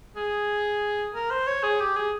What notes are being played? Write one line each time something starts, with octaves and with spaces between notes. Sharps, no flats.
G#4
A#4
C5
C#5
G#4
G4
G#4